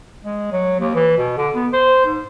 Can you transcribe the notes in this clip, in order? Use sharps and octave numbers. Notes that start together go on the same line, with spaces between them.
G#3
F#3
D#2
E3
B2
D3
B3
C5
G#2